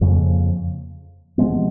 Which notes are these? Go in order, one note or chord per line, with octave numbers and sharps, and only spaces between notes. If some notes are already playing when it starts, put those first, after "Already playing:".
F2 C#3 F3 A#3
C3 F3 G#3 B3